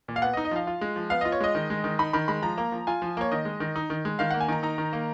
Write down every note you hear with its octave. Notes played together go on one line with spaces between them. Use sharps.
A#2
F5
B3 F#5
D#5
D#4
D#5
F3 F5
F4
G#3
F3
B3 F5
F4 D#5
C#5
G#3 D#5
D#3
G#3
D#3
D#4 B5
D#3 B5
G#3 B5
F3 A#5
A#3
F3
F4 G#5
F3
A#3 C#5
D#3 D#5
G#3
D#3
D#4
D#3
G#3
D#3 F5
A#3 F#5
G#5
D#3 A#5
D#4 A#5
D#3
A#3